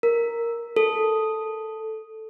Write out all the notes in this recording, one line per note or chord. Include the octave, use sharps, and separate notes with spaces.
A#4
A4